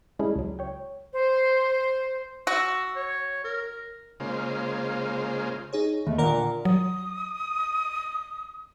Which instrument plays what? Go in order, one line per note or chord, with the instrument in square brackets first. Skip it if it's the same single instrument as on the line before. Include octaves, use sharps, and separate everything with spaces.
[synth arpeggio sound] G3 G#3 C#4 D4 E4 G#4
C#2 F#3
C#5 G5
[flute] C5
[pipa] F#4 [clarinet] E6
[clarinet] C#5
A#4
[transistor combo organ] C#3 G#3 A#3 F4 C5
[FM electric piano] D#4 G#4 C#5
[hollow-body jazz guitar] D#2 [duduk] A3
[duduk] A#2 [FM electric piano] D3 D5 F#5 [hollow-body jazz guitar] A#4
[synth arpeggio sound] F#3 [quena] D#6